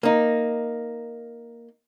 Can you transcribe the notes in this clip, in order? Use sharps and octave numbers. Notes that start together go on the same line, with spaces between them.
A#3 D#4